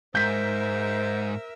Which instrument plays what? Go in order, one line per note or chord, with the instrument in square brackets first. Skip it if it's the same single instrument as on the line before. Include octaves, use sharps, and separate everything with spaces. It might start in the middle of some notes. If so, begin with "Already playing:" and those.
[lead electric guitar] G#2 [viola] A#4 E5 [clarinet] C5 [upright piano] G6 B6